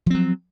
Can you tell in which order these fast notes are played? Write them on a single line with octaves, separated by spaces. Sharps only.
F3 C4 F#3